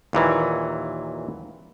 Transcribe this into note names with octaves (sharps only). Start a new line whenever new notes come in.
D#2 A#2 E3 F#3